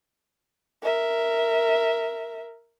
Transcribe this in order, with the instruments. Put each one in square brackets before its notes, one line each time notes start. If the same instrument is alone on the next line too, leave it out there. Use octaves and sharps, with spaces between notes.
[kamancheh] A#4 E5